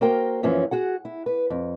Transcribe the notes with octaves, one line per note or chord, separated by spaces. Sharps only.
A#3 F#4 A#4 C5 G5
F#2 E3 F3 A#3 C#4
F#4 G#4 F#5
E4
B4
F2